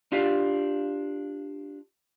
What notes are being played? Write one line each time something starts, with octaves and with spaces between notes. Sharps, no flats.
D4 F4 G4 F5